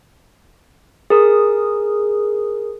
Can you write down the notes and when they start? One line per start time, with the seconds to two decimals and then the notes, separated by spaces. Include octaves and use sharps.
1.10 G#4 A#4 D#6